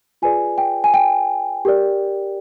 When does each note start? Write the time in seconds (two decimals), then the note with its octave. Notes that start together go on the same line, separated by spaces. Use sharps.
0.22 F4 G#4 B4 D5 G#5
0.58 G5
0.84 G#5
0.94 G5
1.65 G4 A#4 D5